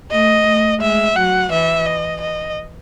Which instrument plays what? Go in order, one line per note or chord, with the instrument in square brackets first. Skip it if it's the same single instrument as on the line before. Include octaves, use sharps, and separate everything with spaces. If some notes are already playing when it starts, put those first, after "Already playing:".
[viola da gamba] A3 [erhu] D#5
[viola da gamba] A3
[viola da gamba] G#3 [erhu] E5
[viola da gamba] F#3 [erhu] F#5
[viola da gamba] E3 [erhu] E5
[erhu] D#5
D#5